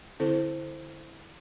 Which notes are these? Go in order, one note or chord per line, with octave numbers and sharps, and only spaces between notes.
D3 C4 E4 A4 C5